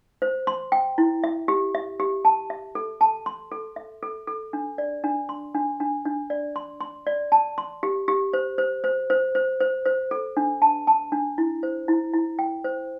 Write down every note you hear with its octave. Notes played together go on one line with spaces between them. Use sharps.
C5
C6
G5
E4
E5
G4
E5
G4
A5
E5
A4
A5
C6
A4
E5
A4
A4
D4
D5
D4
C6
D4
D4
D4
D5
C6
C6
D5
A5
C6
G4
G4
C5
C5
C5
C5
C5
C5
C5
A4
D4
A5
A5
D4
E4
C5
E4
E4
G5
C5